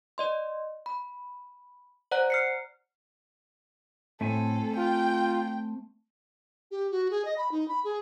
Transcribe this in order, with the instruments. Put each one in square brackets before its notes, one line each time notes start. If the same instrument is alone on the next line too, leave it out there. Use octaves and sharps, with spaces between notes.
[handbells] D5 D#5 C6
B5
C5 D5 F#5 A#5 F#6
F6 C7 C#7
[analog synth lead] A2 [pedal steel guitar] A3 C4 G#5 [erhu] A4
[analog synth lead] F4 [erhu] G5
[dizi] G4
F#4
G#4
D#5
B5
D#4
B5
G#4